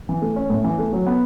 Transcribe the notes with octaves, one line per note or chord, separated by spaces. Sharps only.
E3
A3
C#4
A2
E3
A3
F#3
B3